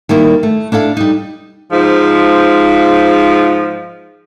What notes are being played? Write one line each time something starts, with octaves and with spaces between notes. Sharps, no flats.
D#3 G3 A#3 E4
A3
D4 E4 A4 F5
G3 D#4
G#2 F3